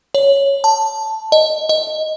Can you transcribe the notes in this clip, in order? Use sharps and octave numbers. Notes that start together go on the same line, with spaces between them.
C#5
A5
D#5
D#5